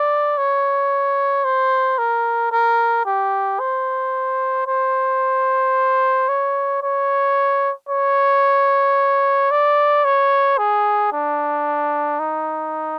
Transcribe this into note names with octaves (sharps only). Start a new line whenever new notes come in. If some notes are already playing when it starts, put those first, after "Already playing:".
Already playing: D5
C#5
C5
A#4
A#4
G4
C5
C5
C#5
C#5
C#5
D5
C#5
G#4
D4
D#4